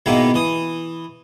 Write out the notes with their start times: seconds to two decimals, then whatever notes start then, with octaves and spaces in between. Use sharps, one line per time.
0.06 G#2 B2 D#3 A#3 E4
0.34 E3 D#6